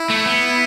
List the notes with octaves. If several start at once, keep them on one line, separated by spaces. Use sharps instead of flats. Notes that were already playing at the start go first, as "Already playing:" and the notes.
Already playing: E4
A3
B3